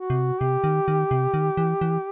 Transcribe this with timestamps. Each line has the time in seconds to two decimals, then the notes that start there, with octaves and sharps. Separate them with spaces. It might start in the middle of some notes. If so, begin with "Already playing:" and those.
Already playing: F#4
0.10 C3
0.40 C3 G4
0.64 D#3
0.88 D#3
1.11 C3
1.34 D#3
1.57 E3
1.81 E3